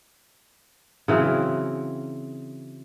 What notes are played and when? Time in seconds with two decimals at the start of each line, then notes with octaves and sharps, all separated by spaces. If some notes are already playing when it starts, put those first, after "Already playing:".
1.08 C#3 E3 F#3 C4